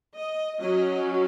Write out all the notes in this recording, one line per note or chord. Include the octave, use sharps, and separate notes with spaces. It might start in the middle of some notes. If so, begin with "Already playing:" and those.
D#5
F#3 C#4 D#5